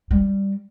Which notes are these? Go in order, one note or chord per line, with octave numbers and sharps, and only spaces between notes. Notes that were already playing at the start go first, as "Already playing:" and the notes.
G3